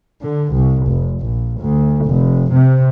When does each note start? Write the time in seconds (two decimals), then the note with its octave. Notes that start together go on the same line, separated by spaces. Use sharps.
0.23 D3
0.53 C2
0.88 F1
1.21 A#1
1.60 D2
2.06 F1
2.51 C3